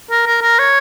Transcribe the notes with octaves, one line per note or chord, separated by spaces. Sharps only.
A#4
A#4
A#4
C#5